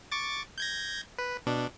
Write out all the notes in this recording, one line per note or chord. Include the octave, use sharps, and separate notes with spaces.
C#6 D6 A6
G6 G#6 A#6
B4
B2 D4